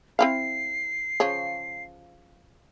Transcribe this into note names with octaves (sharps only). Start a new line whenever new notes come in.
C4 E4 F5 C7
C#3 F3 C#5